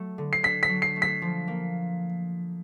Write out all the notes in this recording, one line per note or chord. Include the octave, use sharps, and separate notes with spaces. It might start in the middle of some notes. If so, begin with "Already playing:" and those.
Already playing: F#3 A3
D3
C7
D4 B6
B6
F#3
C7
A3
B6
F3
A#3